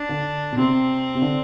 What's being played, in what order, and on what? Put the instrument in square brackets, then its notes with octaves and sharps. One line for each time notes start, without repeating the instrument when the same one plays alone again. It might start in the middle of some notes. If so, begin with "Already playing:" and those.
Already playing: [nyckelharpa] D4
[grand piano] D3
B2
[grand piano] C3 [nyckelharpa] C4
[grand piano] C3
D3